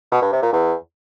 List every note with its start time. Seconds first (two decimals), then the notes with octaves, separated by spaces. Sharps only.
0.12 B2
0.22 G2
0.32 C3
0.42 A#2
0.53 E2